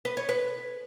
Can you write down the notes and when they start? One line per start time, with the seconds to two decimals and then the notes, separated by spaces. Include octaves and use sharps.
0.05 B4
0.17 C#5
0.29 B4